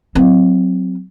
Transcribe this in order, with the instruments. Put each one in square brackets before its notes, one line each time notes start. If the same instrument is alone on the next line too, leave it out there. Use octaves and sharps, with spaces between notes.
[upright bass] F#3 C4